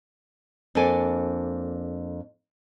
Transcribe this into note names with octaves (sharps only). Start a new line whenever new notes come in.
F2 A#3 D4 A4 D5 G#5